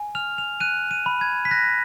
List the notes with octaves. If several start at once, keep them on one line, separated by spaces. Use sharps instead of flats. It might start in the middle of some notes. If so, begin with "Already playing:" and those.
Already playing: G#5
F6 F7
F7
F#6 D#7
D#7
B5
G#6
B6
F#6 A#6